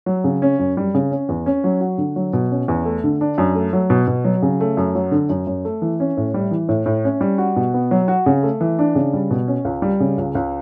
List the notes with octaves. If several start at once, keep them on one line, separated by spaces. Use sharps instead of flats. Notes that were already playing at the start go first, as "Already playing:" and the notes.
F#3
C#3
C#4
F#2
G3
C#3
C#4
E2
C#4
F#3
F#4
D3
F#3
B2
C#4
E2
A3
D3
D4
F#2
A3
F#3
B2
B2
F#3
C#3
A3
F#2
F#3
D3
F#2
F#2
A3
E3
C#4
A2
G3
E3
A2
A2
C#4
G3
F#4
B2
B3
F#3
F#4
C#3
A3
E3
D4
C#3
G3
B2
C#4
C#2
G3
C#3
C#2
C#2